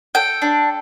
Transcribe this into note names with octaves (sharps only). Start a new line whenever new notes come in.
A4 G5
D4